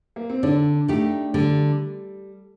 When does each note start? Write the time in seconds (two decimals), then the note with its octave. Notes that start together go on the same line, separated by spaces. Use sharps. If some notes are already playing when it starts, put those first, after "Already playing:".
0.16 A#3
0.30 C4
0.43 D3 D4
0.88 A3 D#4 G4
1.33 D3 G3